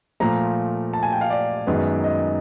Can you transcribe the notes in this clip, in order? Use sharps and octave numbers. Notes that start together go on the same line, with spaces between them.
A#2 F3 A3 A#5
A5
G#5
G5
F5
D5
F#2 D#3 G#3 B3
D#5